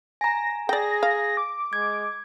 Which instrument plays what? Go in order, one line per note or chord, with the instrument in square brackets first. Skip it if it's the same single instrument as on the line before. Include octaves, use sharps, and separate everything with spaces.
[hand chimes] G#5 A#5 [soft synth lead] A#6
[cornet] G#4 [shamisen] D5 G5 [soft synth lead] A#6
[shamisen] F5
[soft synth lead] D6
[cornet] G#3 [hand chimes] G#6